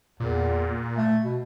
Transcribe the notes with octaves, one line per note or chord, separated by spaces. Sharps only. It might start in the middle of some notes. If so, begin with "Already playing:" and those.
E2 A#2
A3
B2